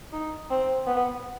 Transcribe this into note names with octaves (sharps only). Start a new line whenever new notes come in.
D#4
C4
B3